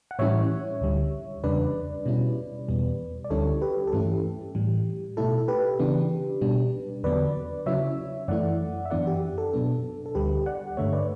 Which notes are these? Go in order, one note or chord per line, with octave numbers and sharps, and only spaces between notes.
F#5
A2 E3 G3 C#4 E4 C#5 E5
D2 D3 G3
E2 C#3 G3 D4 B4 D5
B2 G3 C#4 E4
E2 B2 G3 B3
D5
D2 D3 G3 C#4 E4 A4 C#5
G4 B4
A4
G2 E3 A3 C#4 E4 G4
A2 E3 G3
B2 A3 E4 A4
A4
G4 B4
C#3 E3 B3 D4
B2 G3 D4
E2 D3 F#3 B3 B4 D5
C#3 F#3 C#4 E4 C#5 E5
F#2 E3 A3 E4 D5 F#5
E5
F#2 E3 B3 D4 D5 F#5
G4
A4
B2 F#3 B3 D4
A4
D2 D3 G3 G4 B4
D5 F#5
G2 D3 A3 C#5 E5
B4 D5